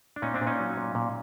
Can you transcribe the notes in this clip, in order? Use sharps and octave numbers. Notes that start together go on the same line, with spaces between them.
D4
A#2 C#4 D#4
C4 D4
A#2
C#4 D#4
F#3
A#2
A#2